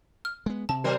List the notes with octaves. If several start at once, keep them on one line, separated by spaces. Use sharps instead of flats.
F6
G#3 B3
C3 A5
F#3 A#4 C5